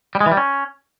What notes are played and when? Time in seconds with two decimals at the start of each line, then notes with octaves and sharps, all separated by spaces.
0.15 G3
0.21 G#3
0.26 E3
0.32 G3
0.37 C#4